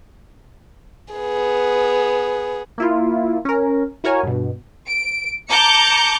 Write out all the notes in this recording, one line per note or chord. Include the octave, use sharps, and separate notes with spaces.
B3 G#4
A#3 E4 F4
C#4 A#4
E4 F#4 A#4 C#5 G#5
G2 B2
D7
A5 A#5 D6 G6 C#7